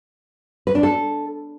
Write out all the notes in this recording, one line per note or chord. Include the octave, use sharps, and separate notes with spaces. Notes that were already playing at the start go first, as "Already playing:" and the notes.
B4
D4
A4